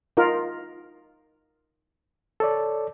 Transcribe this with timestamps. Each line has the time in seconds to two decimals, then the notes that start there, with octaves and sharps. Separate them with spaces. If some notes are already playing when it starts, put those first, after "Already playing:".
0.17 D#4 F4 A#4
2.40 A4 C#5 D5